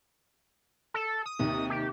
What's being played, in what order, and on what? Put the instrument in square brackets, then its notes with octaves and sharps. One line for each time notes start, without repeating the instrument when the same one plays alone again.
[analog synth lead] A4
D#6
[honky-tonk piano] D#2 C3 D#3
[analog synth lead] G4